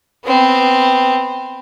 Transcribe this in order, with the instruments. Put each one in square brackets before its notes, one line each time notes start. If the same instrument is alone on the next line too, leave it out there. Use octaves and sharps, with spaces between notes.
[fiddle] B3 C4